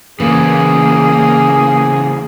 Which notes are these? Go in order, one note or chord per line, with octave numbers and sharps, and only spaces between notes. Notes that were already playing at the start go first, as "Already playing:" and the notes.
E2 C#3 E3 A#3 G#4